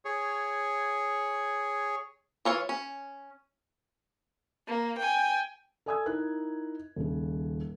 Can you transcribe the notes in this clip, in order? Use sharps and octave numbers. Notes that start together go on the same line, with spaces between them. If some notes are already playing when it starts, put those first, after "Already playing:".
G#4 C#5
E3 F4 C#5
C#4
A#3
G5 G#5
A4 D5 G#5 D#6 E6 G#6
D#4 E4 A#4 F#6
D#1 C#3